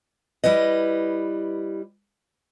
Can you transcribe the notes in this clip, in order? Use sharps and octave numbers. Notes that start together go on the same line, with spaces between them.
G3 E4 B4 D#5